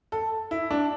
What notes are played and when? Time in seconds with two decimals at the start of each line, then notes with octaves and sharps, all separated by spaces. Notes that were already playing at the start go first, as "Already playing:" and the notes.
0.12 A4
0.51 E4
0.71 D4